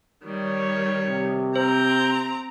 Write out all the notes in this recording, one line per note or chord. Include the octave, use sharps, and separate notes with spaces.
D#3 G3 C#5
C3
C4 C5 A#5 G6